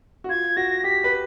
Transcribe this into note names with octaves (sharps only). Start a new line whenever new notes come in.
F#4
F4 G#6
F#4 A#6
G4 B6
B4